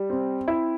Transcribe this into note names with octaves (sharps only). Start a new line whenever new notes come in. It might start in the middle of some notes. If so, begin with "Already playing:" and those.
Already playing: G3
C4
E4